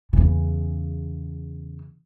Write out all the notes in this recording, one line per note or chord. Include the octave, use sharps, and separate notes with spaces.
E2 C#3